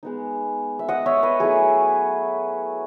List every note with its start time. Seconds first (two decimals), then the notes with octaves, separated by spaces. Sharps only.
0.03 G#3 B3 D#4
0.79 E5
0.89 D#5 F#5
1.06 C#5 E5
1.23 B4 D#5
1.40 F#3 A3 E4 G#4